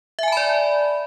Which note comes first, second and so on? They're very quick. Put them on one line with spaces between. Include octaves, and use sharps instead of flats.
E5 G#5 A5 B5 D5